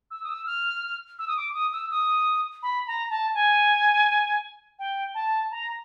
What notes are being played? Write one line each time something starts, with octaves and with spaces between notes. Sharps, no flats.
E6
D#6
E6
F6
E6
D#6
D6
D#6
E6
D#6
B5
A#5
A5
G#5
G5
A5
A#5